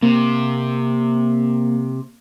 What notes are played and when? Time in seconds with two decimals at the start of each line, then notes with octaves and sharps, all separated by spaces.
0.02 C3 A#3